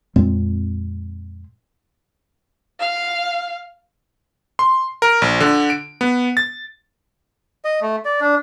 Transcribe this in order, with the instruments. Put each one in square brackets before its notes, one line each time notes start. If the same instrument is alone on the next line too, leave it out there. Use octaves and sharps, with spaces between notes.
[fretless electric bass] F2 A#2 G#3 C4
[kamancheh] F5
[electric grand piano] C6
A#4
A#1
D3
D7
B3
A6
[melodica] D#5
A3
D5
D4